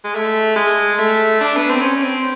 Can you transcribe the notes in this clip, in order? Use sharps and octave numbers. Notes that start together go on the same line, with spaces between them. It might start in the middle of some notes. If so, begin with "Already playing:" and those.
G#3
A3
G#3
A3
D4
B3
C4
C#4
C4